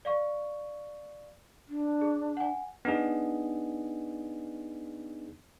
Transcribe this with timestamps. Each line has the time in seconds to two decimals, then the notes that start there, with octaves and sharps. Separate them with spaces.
0.05 D5 F5 C#6
1.68 D4
2.01 G#4
2.37 F#5 G#5
2.85 B3 D4 D#4 G#4